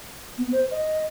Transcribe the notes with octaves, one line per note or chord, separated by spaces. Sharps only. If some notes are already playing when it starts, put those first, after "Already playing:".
B3
C5
D#5